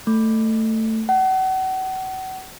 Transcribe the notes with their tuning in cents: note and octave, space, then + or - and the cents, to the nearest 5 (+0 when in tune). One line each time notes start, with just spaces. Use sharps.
A3 +15
F#5 +35